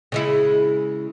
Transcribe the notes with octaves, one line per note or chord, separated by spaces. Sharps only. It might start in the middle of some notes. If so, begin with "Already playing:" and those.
C#3 G#3 E4